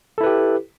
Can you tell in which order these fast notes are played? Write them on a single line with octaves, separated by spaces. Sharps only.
A4 E4 B4 G4